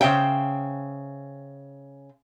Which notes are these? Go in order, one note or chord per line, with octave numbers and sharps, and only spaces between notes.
C#3 C5 E5 G5